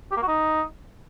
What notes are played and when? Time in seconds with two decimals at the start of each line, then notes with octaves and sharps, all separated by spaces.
0.11 G4
0.17 A#3
0.22 F#4
0.28 D#4